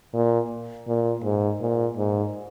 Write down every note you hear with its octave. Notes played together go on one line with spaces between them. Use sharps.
A#2
A#2
G#2
A#2
G#2